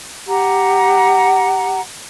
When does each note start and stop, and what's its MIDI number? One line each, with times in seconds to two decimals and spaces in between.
0.28 1.80 67
0.28 1.80 78
0.28 1.80 82